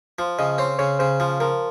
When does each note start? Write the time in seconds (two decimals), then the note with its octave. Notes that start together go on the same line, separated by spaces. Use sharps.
0.19 F3
0.39 C#3 D#5
0.58 C4 C#5
0.79 C#3 C#5
0.99 C#3 C5
1.20 F3
1.40 F3 A#4